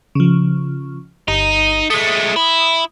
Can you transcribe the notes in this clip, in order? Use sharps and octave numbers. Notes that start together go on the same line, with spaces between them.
C#3 F3
G1 D#4
G#3 A3 D#6
E4